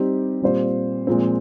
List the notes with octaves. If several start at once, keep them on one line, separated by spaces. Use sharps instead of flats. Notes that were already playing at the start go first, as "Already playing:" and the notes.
Already playing: G3 C4 D#4 G4
A#2 G3 C4 F4 C5
A#2 F3 G#3 C4